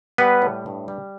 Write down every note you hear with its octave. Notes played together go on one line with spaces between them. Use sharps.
G3 B3 B4
A2
G2
G3